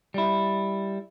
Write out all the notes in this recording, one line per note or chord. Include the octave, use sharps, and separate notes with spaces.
G3 E4